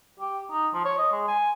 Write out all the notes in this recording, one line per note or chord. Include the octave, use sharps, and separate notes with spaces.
G4
D#4
F3
C#5
D#5
G#3
G#5